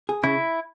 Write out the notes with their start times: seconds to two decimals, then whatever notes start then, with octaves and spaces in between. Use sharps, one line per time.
0.09 G#4
0.23 C#3 E4